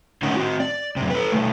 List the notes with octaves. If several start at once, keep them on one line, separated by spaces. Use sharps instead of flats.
A2 D3 C#4 D#4 A#4 F#5
C4 F#4
D5
F#2 C3
A4 B4
B2 A3